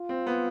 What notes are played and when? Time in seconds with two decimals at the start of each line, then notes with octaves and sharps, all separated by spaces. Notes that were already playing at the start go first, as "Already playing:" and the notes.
Already playing: F4
0.09 C4
0.27 B3